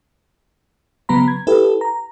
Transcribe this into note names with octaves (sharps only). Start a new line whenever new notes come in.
C#3 F#3 B3 A#5 B5
G#6
E4 G4 A4 B4
A#5